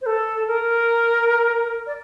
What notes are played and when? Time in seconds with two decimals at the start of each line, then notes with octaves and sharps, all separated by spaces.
0.01 C5
0.06 A4
0.47 A#4
1.86 D5